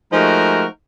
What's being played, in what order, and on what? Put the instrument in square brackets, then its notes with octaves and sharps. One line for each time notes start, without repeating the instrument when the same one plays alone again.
[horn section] F3 G#3 A3 D#4 F#4 A#4